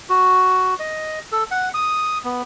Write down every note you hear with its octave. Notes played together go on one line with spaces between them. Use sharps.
F#4
D#5
A4
F#5
D#6
B3